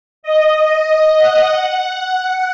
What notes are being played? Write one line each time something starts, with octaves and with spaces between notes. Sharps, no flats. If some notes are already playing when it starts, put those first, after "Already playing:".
D#5
F#5
F#5